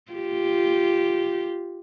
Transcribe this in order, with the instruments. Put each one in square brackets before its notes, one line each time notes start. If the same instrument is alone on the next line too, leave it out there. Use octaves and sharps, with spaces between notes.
[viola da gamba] F4 G4